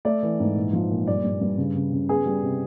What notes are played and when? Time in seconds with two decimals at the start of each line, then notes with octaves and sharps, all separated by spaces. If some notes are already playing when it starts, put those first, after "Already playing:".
0.05 A3 D5
0.23 E3
0.40 G#2
0.56 A#2
0.73 F3
0.90 A#2
1.07 G2 D5
1.24 G2
1.41 G2
1.58 C#3
1.75 C#3
1.92 C#3
2.09 B3 G#4
2.26 G3
2.43 C3